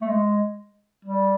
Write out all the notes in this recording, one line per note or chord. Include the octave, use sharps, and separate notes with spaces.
A3
G#3
G3